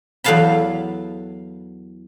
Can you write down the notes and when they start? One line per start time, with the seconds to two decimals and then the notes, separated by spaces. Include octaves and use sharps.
0.24 E2 F#3 A4 F5 A5 B5